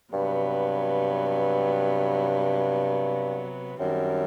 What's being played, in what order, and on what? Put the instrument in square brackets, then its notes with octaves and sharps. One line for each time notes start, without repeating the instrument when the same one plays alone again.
[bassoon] G2 [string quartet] C3 F#3 B3
[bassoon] F#2 [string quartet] D#3 G3 C4